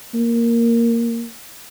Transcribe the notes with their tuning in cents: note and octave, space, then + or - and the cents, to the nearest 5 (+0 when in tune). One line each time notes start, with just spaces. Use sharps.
A#3 -5